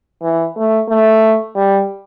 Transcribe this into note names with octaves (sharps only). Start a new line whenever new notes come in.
E3
A3
A3
G3